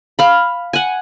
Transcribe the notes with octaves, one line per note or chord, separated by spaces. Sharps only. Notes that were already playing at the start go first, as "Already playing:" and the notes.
F5 B5
F#5 G#5